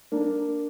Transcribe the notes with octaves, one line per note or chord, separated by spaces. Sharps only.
A#3 D4